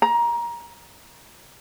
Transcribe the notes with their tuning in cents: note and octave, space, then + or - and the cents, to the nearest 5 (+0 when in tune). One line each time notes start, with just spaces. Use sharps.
A#5 +20